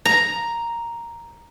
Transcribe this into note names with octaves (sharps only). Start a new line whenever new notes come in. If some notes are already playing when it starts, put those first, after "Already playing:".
A#5